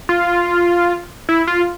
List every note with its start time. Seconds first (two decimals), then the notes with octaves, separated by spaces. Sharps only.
0.09 F4
1.29 E4
1.47 F4